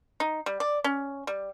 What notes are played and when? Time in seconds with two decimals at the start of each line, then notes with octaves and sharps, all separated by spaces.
0.20 D#4
0.46 G3
0.60 D5
0.84 C#4
1.27 G3